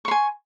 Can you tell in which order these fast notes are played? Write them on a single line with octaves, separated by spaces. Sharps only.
C#6 C6 G#5